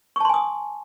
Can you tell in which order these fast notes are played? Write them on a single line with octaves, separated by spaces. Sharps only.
C#6 A5 C6 G#5 D#6